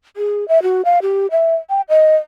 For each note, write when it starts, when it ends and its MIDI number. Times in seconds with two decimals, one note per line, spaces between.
0.17 0.47 68
0.48 0.62 76
0.63 0.82 66
0.85 0.99 77
1.02 1.27 67
1.31 1.55 76
1.70 1.81 79
1.89 2.16 75